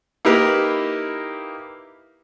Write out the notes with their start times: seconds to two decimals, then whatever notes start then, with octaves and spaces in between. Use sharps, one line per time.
0.25 A#3 D#4 E4 G4 A#4 B4